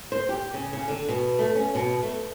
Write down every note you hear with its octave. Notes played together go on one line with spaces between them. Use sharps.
C5
G4
C#3
C#3
D3
B2
A3
C#4
B2
A3